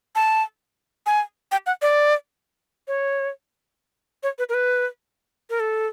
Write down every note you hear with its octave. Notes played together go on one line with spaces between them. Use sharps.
A5
G#5
G5
F#5
D5
C#5
C#5
B4
A#4
B4
A#4
A4